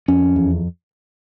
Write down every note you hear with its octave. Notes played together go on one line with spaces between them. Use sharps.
F2 C#4
E2